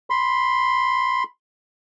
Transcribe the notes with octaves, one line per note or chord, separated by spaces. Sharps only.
B5 C6